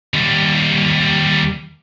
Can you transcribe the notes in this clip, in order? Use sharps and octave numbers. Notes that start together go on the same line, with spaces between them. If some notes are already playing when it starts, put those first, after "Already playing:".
D#2 G3